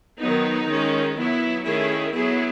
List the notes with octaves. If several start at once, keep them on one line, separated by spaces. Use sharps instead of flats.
D#3 F#3 B3 D#4
D#3 G#3 C#4
F#3 B3 E4
D#3 A3 C#4 E4 G#4
F#3 B3 E4 G#4